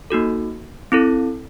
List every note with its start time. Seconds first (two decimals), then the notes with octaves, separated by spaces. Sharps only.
0.10 A#3 D#4 F#4 A4
0.92 C4 E4 A4